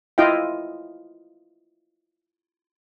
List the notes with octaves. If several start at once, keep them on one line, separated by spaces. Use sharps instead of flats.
E4 F4 D#5 F5 G5